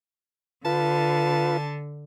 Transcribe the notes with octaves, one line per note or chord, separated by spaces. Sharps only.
D3 F4 B4 A5